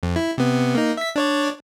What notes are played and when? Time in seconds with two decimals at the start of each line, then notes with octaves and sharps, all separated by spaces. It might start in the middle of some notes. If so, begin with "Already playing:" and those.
0.03 F2
0.16 E4
0.38 C3 B3
0.75 A#3 D#4
0.97 E5 B6
1.16 D4 C#5 D5